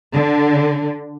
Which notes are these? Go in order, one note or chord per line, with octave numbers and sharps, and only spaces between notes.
D3